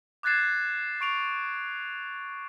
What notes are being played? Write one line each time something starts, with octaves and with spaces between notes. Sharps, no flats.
D6 F#6 G#6 A6 C7 E7
C#6 D7 F7